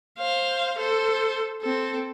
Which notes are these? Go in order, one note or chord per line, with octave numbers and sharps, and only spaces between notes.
C5 F5
A4 C5
C4 A4